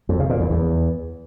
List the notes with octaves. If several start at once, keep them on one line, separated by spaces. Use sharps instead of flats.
F2
C#3
A#2
E2
E2